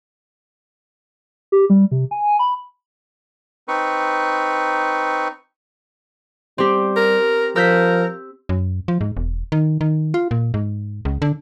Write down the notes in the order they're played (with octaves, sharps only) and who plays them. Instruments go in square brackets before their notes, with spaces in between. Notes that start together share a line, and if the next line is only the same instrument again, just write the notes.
[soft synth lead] G4
G3
C3
G#5
B5
[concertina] C4 D#4 B4 C#6
[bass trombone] G3 [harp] C4 G4
[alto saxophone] A#4
[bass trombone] F3 [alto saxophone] A#4 [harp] E6 G6 B6
[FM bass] F#2
F3
G#2
E1
D#3
D#3
F4
A#2
G#2
C#2
D3